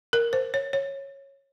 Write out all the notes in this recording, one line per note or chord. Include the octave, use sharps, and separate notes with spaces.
A#4
C5
C#5
C#5